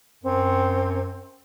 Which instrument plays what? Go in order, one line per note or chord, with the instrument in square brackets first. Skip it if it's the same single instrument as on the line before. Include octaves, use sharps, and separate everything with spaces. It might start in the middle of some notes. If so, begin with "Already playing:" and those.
[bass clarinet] F#2 [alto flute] C4